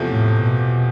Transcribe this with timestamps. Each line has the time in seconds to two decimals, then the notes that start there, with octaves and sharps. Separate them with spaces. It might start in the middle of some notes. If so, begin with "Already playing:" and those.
Already playing: E2 C3 F3 A3
0.08 A2
0.39 B2